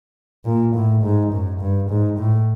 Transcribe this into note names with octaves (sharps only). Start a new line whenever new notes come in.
A#2
A2
G#2
F#2
G2
G#2
A2